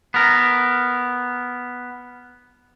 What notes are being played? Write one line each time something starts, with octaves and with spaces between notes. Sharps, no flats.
B3 A#4